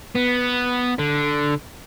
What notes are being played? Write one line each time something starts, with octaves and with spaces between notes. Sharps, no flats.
B3
D3